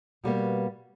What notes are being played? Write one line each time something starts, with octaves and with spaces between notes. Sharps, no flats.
B2 G3 A#3 B3